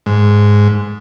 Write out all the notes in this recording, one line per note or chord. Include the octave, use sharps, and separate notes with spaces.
G#2